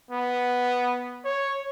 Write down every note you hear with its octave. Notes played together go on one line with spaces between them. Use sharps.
B3
C#5